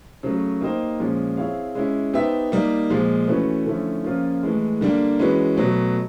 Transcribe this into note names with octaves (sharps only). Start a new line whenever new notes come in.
C#3 F#3 A3
A#3 D#4 G4 C5 D#5
A#2 F3 G#3 C#4
C4 E4 G#4 C#5 F5
G#3 C#4 E4
B3 D#4 G4 C5 E5
G3 A#3 D#4
A#2 F3 G#3
E3 A3 C#4 F#4 B4
D3 F3 A3 C#4 E4
C#3 F3 A#3 C#4 F4
A2 E3 G#3
D3 G3 A#3 D4
E3 G#3 C#4 F#4 B4
B2 F#3 A3